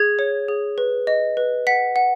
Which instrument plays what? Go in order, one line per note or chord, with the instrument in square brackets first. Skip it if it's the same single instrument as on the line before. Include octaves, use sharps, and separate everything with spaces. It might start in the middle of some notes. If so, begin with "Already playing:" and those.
Already playing: [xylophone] G#4 G#6
C#5
G#4
B4
D#5
B4
F#5 B6
F#5